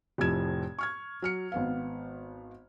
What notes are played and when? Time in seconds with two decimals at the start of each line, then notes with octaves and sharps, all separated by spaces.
0.18 F1 F2 A2 F3 G#6 E7
0.79 C#6 F6 G#6
1.22 F#3 F6 C#7
1.52 G#1 B3 F5